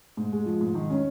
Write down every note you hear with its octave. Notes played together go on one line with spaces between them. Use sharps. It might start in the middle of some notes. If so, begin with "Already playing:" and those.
G#2
G#3
F3
G#2
D#3
C#4